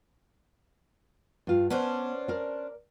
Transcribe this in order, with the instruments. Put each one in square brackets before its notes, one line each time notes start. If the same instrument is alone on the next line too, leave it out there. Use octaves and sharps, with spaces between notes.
[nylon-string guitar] G2 F4
[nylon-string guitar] B3 [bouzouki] C#4 D4 C5
[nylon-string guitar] A#4 D5